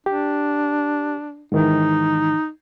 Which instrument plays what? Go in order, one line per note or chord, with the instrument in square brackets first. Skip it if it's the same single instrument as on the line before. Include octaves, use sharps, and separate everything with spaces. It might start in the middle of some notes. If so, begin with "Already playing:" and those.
[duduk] D4 [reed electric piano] G4
[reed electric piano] G#2 D#3 E3 [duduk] D#4